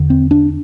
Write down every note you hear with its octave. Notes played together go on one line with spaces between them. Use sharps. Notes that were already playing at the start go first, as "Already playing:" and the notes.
Already playing: E2 D3
C4
D4